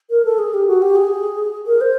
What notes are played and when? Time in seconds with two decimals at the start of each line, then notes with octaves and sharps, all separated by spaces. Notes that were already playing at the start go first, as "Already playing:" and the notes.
0.10 A#4
0.25 A4
0.38 G#4
0.54 G4
0.67 F#4
0.82 G4
0.96 G#4
1.67 A#4
1.81 C5